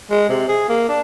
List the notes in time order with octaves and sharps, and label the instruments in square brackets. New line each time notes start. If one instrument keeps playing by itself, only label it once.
[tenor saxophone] G#3
C3
G#4
A#3
D4